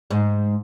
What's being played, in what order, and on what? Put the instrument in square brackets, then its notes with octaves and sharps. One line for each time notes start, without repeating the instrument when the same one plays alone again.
[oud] G#2